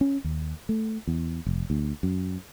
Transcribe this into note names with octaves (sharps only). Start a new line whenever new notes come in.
C#4
D#2
A3
E2
F1
D2
F#2